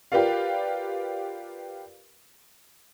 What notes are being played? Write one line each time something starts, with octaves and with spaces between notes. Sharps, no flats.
F4 G4 A#4 B4 D5 F5